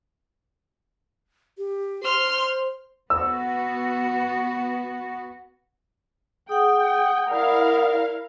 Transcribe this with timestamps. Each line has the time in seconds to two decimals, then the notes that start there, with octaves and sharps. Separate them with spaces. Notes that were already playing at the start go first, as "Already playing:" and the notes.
1.58 G4
2.03 C5 C6 F6
3.10 B3 F#4 E6
6.49 G#4 F#5 G5 D#6
7.30 E4 A#4 D5 F5